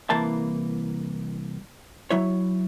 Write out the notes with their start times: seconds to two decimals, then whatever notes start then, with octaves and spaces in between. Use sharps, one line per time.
0.10 C2 E3 A#3 A5
2.11 F#3 E4 C#5